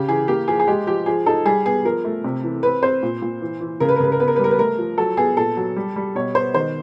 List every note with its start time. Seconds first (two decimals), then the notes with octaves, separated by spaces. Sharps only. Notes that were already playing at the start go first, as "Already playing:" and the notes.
Already playing: C#3 G4
0.08 E3 G#4
0.28 A#3 G4
0.48 F3 G#4
0.60 G#4
0.67 G#3 G4
0.87 F3 G4
1.06 F3 G#4
1.26 D#4 A4
1.45 G3 G#4
1.66 B3 G#4
1.84 F3 A#4
2.05 A3
2.24 C3
2.44 E3
2.63 C4 B4
2.83 C4 C5
3.03 A#2
3.22 A#2
3.41 E3
3.61 E3
3.80 C#3 A#4
3.89 B4
3.96 A#4
4.00 C#3 B4
4.12 A#4
4.20 B3 B4
4.28 A#4
4.36 G3 B4
4.44 A#4
4.51 B4
4.59 A3 A#4
4.78 F3
4.98 F#3 A4
5.17 B3 G#4
5.37 A#2 A4
5.57 F#3
5.76 G3
5.96 G3
6.15 B2 C#5
6.35 B3 C5
6.54 D#3 C5